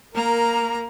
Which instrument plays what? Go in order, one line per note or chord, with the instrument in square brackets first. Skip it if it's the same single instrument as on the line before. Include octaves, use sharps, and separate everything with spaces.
[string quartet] A#3 A#5 [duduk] A#4